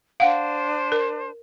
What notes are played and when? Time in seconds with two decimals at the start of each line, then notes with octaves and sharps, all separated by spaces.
0.20 D4 C5 F5 F#5
0.92 A#4